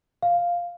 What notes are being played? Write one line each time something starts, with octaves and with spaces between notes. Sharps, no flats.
F5